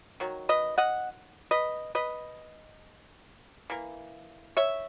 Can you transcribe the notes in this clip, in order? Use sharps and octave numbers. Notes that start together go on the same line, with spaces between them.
D#3 F#3
B4 D#5
D#5 F#5
B4 D#5
B4 D#5
E3 A#3
C#5 E5